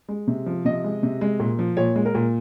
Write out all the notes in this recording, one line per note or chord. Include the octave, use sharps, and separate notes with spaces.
G#3
C3
F3
C3 D#5
G#3
C3
G#3
A#2
F3
A#2 C#5
G#3
A#4
A#2